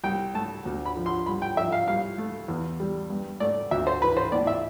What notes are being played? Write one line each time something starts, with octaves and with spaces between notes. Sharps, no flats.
C2 G5
A3 A5
D2
B5
F3
C6
C2 B5
G5
F3 E5
F5
C2 F5
A3
E2
G3
G2
A3 D5
D2 E5
C5
E3 B4
C5
A2 D5
E5